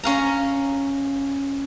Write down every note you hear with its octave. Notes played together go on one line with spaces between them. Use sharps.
C#4 F5 A#5